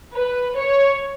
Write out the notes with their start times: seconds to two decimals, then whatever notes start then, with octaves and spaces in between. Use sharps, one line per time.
0.15 B4
0.57 C#5